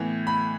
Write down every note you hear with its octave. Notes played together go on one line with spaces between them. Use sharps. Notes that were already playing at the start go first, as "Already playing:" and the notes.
Already playing: A2 E3 B3
B5